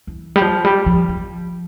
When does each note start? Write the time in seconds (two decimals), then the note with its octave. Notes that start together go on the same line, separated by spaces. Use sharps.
0.07 E3
0.36 G3
0.42 F3
0.65 G3
0.86 F3
1.09 F3